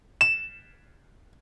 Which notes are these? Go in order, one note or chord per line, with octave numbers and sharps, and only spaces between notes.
E7